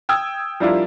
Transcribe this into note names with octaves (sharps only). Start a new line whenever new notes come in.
G5 D#6 E6 G#6
F3 G3 D4 E4 F4 A#4